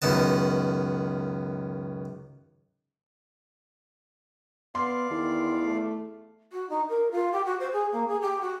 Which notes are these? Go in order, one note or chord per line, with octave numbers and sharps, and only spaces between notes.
C#2 F#2 D#3 B3 A5
B3 D5 F5 C6
E2 D#3
A3
F#4
D#4
A#4
F4
G4
F#4
C5
G#4
A#3
G#4
G4
F#4